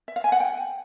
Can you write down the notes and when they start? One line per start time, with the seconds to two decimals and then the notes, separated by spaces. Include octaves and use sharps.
0.08 E5
0.16 F5
0.24 G#5
0.32 F#5
0.40 G5